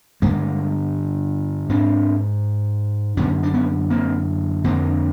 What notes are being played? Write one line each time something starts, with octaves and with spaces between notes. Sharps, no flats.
G2 D3 G#3 A#3
G#2 C4 D4
F#2 D3 B3 C#4
D4
B3 C#4
A#3 C4
F2 D3 A#3 C4